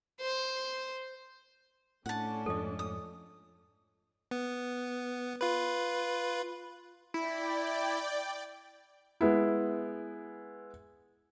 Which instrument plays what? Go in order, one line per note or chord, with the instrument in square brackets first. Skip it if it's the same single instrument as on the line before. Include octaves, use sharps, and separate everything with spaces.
[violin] C5
[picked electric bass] A2 [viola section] A3 C#4 D4 [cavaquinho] F#5 A5
[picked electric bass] F2 G#2 F3 [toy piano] A4 D#5
[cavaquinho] D#6
[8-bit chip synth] B3
F4 B4
[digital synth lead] E4 [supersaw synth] D5 G5
[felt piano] G#3 B3 E4